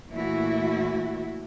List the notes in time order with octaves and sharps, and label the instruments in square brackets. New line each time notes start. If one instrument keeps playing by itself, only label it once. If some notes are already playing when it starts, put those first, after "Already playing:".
[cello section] A#2 E3 A3 E4 F#4